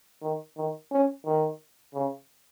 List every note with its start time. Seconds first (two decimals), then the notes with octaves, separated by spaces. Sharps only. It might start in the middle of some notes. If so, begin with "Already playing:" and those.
0.22 D#3
0.57 D#3
0.92 C#4
1.26 D#3
1.94 C#3